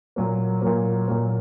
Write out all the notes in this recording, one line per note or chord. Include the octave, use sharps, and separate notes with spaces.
A#2 F#3 A#3
A#2 F#3 A#3
A#2 F#3 A#3